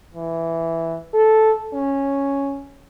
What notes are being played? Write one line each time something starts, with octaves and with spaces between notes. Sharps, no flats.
E3
A4
C#4